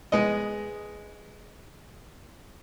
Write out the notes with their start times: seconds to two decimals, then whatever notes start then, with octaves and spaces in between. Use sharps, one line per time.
0.12 G#3 B3 D#5